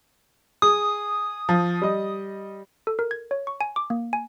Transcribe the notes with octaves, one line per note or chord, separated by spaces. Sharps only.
G#4 D#6
F3
G3 D#5
A4
A#4
G#6
C#5
C#6
G#5
D6
A#3
G#5